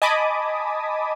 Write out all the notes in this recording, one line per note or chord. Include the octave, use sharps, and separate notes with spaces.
D#5 G#5 A5 B5 D6 D#6